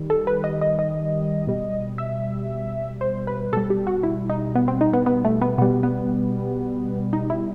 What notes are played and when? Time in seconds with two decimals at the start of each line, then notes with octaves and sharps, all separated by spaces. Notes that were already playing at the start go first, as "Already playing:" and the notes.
Already playing: D#3 G3
0.10 A4
0.27 B4
0.44 D#5
0.61 D#5
0.79 D#5
1.47 B2 G3
1.98 E5
3.01 C5
3.27 B4
3.53 B2 G3 A4
3.70 G4
3.87 F#4
4.03 E4
4.30 D#4
4.55 B3
4.68 C4
4.81 D#4
4.93 B3
5.06 B3
5.24 A3
5.42 B3
5.58 B2 G3 B3
5.83 B3
7.13 D#4
7.30 E4